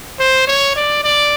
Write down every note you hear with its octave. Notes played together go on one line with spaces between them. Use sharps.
C5
C#5
D5
D5